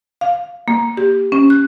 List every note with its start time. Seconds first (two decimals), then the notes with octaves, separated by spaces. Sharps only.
0.21 F5
0.68 A#3
0.97 G4
1.32 C#4
1.50 F#6